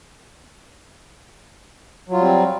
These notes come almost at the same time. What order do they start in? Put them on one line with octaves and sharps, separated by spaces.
F#3 F4 G3 C4